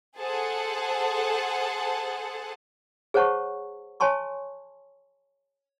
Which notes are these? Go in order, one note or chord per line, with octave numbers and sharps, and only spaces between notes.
G#4 A4 C5 F#5 A5
G#4 C5 C#5 F#5 A5 C#6
C#5 G#5 A5 C6 C#6